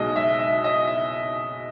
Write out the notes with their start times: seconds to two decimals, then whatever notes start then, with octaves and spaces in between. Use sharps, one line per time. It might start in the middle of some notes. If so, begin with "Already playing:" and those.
Already playing: B1 B2 G#3 D#5
0.16 E5
0.39 E5
0.64 D#5
0.87 E5